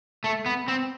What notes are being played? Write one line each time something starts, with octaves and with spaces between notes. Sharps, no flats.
A3
B3
C4